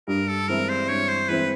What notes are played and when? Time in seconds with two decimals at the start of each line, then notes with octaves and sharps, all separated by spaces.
0.08 G2 A#4
0.28 A4
0.48 E3 G#3 C4 E4 A#4
0.69 C5
0.88 G2 C#5
1.08 C5
1.29 E3 G#3 C4 E4 B4